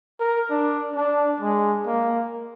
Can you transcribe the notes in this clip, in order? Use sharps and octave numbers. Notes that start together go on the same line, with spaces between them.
A#4
D4
D4
G#3
A#3